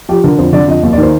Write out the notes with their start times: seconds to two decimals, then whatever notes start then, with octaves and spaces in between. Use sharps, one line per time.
0.09 F3 G4
0.23 D3 A#4
0.38 F2 C5
0.53 D3 D5
0.68 F2 D#5
0.83 D#2 D#5
0.93 D5
0.98 D#3 C5